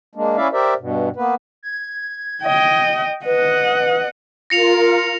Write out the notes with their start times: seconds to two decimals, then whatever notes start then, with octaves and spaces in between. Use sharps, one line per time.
0.15 G#3 A#3 D4
0.36 C#4 E4 D5 E5 F5
0.53 G4 A#4 C5 D5 E5
0.79 G2 B2
1.16 A#3 B3 B4
1.63 G#6
2.43 D#5 G5
3.25 B4 D#5 F#5
4.50 F4 A#4 A#6 C#7 F7